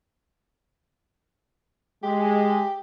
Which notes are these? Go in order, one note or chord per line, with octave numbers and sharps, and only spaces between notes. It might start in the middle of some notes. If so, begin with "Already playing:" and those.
G#3 G4